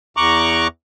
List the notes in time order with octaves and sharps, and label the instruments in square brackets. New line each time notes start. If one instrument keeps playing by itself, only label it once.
[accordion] E2 A#5 C#6 D6 F#6